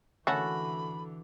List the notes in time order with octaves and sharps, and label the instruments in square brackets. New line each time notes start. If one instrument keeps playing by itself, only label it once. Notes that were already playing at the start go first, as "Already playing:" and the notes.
[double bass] D3 E3 [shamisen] A3 C#4 [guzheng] F#4 A4 F#5 [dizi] B5